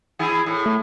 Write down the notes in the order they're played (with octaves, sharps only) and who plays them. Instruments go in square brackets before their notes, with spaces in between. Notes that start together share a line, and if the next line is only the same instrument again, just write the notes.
[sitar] E3 E4 G#4
A2
[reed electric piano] A3